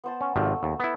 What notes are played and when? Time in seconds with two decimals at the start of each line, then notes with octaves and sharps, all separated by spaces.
0.04 B3 C5 A5
0.21 C#4
0.36 G#1 C3 F3 A3
0.63 D#2
0.80 B3 E4